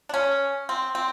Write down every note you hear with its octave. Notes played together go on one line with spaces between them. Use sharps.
D4
C#4
C4
C4